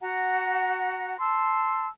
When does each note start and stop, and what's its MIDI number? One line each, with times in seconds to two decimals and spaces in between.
0.01 1.17 66
0.01 1.17 78
0.01 1.17 82
1.18 1.87 81
1.18 1.87 84
1.18 1.87 88